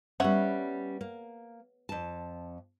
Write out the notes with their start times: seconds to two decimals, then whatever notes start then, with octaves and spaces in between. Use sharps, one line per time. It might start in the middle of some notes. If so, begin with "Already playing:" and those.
0.20 G3 B3 C#4 C#5 E5 F#5
1.01 A#3
1.89 F2 A5